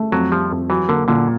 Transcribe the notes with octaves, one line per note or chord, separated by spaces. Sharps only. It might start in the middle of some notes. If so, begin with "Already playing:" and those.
Already playing: A3
F2 F#3
F3 G3
F2
E3 F#3
D3 A#3
A#2 D3